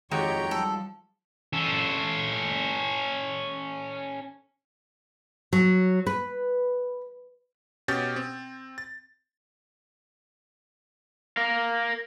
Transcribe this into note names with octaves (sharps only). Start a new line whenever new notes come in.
F2 D#3 G#3 F#4 G4 C#5 G5 A#5
F3 G3 A4
C#4 A4
F#3
B4
B2 C#4 G4 G6 A6
C4
A6
A#4 F5